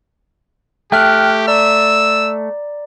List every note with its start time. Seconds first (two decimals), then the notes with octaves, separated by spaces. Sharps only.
0.92 A3 G4 G5 F6 F#6
1.48 D5 A#5 E6